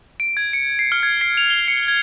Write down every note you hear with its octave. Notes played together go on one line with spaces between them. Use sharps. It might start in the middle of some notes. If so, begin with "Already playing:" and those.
D7
G#6
C#7
C7
F6
G#6
C7
F7
G7
C#7
G#6